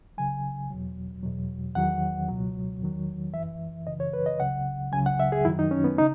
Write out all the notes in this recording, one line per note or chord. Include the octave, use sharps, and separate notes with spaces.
C#2 C#3 F#3 G#5
E2 B2 F#3
E2 B2 F#3
E2 D#3 F#3 F#5
C#2 B2 F#3
E2 D#3 F#3
F#2 E3 E5
F#2 C#3 E3 D#5
C#5
B4
D#5
C#2 C#3 F#3 F#5
C#2 C#3 F#3 G#5
F#5
E5
G#4
F#2 D#3 F#3 E4
D#4
C#4
B3
C#3 D#4